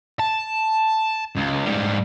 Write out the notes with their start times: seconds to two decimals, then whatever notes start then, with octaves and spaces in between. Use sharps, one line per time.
0.19 A5
1.35 C#2
1.65 G#2 G3